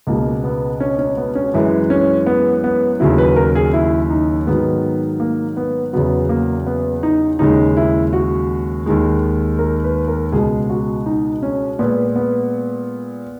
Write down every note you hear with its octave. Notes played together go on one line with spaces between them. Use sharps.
C#2 B2 G#3 A#3
B3
C#4
C#4
B3
C#4
F#2 E3 G#3 E4
C#4
B3
B3
D#2 C#3 F#3 E4
B4
A#4
G#4
E4
D#4
G#2 D#3 F#3 B3
A#3
B3
E2 C#3 F#3 B3
A#3
B3
D#4
D#2 C#3 G#3 D#4
E4
F#4
D#2 D#3 G#3
A#4
B4
A#4
C#2 B2 G#3 G#4
F#4
D#4
C#4
A#2 G#3 B3
B3